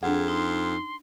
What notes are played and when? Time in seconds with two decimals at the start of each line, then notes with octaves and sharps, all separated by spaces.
0.03 F2 D4 G#4 F#5
0.28 D#4 C6